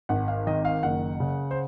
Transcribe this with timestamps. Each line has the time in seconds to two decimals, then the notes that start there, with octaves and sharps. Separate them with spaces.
0.09 G#1 F#5
0.28 F5
0.47 D#3 D#5
0.65 F5
0.83 F#1 F#5
1.20 C#3
1.51 C5